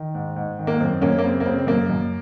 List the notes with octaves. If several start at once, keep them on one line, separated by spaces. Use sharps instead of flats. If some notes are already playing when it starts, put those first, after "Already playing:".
Already playing: D#3
G#2
G#2
D#3
A#3
F#2 C4
F#2 A#3 C#4
A#3
C#3 C4
A#3
C#3 C4
C4
F#2 A#3
F#2